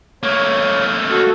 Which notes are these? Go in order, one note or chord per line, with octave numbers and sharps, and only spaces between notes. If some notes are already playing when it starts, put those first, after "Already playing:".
A3 A#3 C#5
F#4 A4